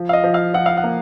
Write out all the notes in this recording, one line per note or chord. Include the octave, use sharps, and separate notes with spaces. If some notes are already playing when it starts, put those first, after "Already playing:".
Already playing: F3
F5
D#5
F3
F5
F3 F#5
F5
F#5
A#3